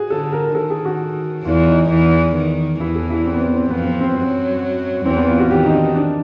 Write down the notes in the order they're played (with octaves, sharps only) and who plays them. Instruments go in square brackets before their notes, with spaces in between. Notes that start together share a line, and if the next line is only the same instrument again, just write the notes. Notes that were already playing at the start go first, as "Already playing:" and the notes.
Already playing: [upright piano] F#4 G#4
[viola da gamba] D3 [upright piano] A4
[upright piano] A#4
[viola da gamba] D#3 [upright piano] A4
[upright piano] G#4
F#4
[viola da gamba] E2 E3 [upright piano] F4
[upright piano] D#4
[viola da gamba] E2 E3
D#3
[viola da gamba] E2 E3 [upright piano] E4
[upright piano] A4
E4
C4
B3
C4
C4
[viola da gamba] F2 F3 [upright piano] B3
[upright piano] C4
C4
[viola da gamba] F#2 F#3
[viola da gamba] E2 E3 [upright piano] C4
[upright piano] B3
F4
F#4
[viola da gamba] D#3 [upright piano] G4
[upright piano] D#4
D4
D4